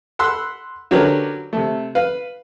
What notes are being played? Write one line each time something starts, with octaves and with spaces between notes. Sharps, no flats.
F#5 B5 C6 E6 F#6
D3 F#3 C#4 G4 A#4 B4
C3 A3
B4 F5